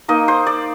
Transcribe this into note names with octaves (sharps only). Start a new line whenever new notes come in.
A#3 D#4 D#5
C5
D5